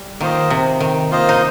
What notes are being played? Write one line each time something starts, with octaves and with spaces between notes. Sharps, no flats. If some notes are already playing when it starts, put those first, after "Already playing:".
Already playing: G3
D#3 A#3 F4 C5 D#5
C3
D#3
A#3 F4 C5 D#5
D#4